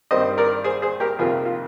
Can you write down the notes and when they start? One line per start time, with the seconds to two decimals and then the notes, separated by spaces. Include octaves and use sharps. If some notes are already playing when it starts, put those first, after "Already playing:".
0.11 G2 D#3 G3 C4 C5 D#5
0.38 A#4 D5
0.64 G#4 C5
0.82 G#4 C5
1.00 G4 A#4
1.19 F2 C3 D#3 A#3 F4 G#4
1.45 F4